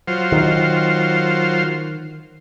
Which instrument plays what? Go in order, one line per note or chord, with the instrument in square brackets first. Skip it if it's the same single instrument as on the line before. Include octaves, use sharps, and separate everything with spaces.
[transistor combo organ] F#3 F4 C5
[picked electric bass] D#3